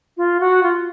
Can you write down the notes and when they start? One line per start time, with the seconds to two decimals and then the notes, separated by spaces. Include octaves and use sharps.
0.17 F4
0.40 F#4
0.63 F4